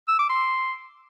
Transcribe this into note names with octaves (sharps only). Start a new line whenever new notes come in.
E6
D6
C6